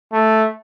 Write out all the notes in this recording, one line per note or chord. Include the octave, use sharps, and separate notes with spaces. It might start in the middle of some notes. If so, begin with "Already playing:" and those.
A3